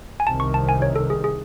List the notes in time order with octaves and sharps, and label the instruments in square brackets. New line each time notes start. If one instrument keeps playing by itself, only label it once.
[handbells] G#5
[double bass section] C2 C3 D#3 [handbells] A5
[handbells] C#6
A5
G#5
C#5
A4
G#4
G#4